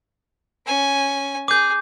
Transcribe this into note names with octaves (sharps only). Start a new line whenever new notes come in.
C#4 G#5
G#4 D6 G6